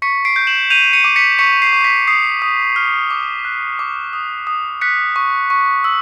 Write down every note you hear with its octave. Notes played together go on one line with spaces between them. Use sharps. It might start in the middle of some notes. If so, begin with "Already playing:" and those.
C#6 B6 C#7
C7 D7
G6
E7 F#7
G6 D#7 F7
C#7 D#7
D6
B6 C#7
C#6 B6 C#7
C7
C#6
B6
D#6 C7
D#6
F6
D6
F#6
D6
D#6
D#6
F#6 B6 C#7
C#6
C#6
E6